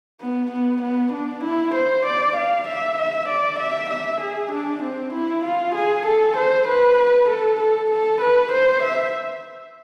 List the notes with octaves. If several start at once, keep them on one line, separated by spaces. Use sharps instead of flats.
B3
B3
B3
D4
E4
C5
D5
F5
E5
E5
D5
E5
E5
G#4
D4
C4
E4
F4
G#4
A4
C5
B4
B4
A4
A4
A4
B4
C5
E5